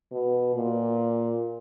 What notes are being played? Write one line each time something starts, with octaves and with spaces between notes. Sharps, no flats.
B2
A#2